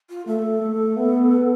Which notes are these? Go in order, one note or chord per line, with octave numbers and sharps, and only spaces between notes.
F4
A3 A4
A3
B3